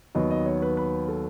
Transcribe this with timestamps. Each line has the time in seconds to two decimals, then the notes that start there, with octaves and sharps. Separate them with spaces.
0.15 D#2 D#3 F#3 B3 D#5
0.31 D#5
0.46 C#5
0.62 B4
0.77 B4
1.09 A4